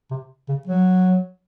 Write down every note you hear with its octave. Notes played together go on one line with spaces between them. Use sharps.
C3
C#3
F#3